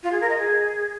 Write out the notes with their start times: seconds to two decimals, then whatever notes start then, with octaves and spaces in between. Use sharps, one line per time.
0.03 F4
0.12 G#4
0.20 A#4
0.29 D#5
0.38 G#4